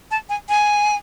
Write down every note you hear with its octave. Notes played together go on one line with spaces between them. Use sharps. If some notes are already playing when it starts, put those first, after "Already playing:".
A5
G#5
G#5